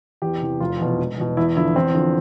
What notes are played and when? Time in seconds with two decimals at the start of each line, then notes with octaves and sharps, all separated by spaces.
0.22 E2 G4
0.41 C3 E3
0.60 F1 F4
0.80 E2 B2
0.99 E1
1.18 E2 B2
1.37 E2 E4
1.57 D3 F3 E4
1.76 E2 C4
1.95 D3 F3